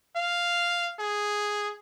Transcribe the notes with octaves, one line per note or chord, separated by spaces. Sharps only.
F5
G#4